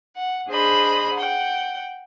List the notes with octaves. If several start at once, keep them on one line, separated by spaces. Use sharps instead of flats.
F#5
D4 G#4 C5 D#5 B5
F#5 G5